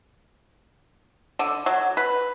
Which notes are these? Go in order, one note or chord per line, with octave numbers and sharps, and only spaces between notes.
D3
F#3
B4